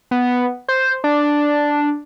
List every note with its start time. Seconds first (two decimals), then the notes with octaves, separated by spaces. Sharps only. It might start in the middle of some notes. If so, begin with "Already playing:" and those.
0.11 B3
0.69 C5
1.04 D4